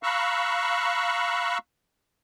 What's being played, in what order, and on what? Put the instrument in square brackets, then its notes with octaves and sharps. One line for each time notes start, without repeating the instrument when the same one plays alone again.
[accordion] F5 A#5 B5 C#6 E6 F#6